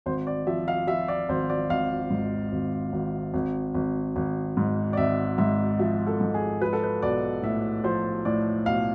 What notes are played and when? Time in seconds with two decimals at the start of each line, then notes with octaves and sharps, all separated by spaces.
0.06 G#1 C5
0.27 D5
0.47 F3 E5
0.68 F5
0.87 F3 E5
1.08 D5
1.29 G#1 C5
1.50 D5
1.70 G#1 F5
2.10 G#2
2.52 G#1
2.93 G#1
3.34 G#1
3.74 G#1
4.16 G#1
4.57 G#2
4.93 D5
4.97 G#1 E5
5.38 G#2 E5
5.79 F3 E5
6.07 A4
6.21 G#2
6.34 G#4
6.62 F3 B4
6.73 A4
6.84 B4
7.03 B1 D5
7.43 A2 E5
7.84 F3 C5
8.25 A2 D5
8.66 B1 F5